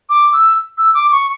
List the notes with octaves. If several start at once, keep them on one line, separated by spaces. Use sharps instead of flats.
D6
E6
E6
D6
C#6